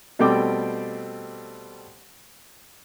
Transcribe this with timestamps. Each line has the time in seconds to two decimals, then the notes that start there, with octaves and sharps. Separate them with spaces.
0.19 B2 G3 A3 C4 G5 D6